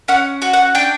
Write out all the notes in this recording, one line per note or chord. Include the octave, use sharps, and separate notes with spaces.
C#4 F#5
F#4
F#5
D4 G5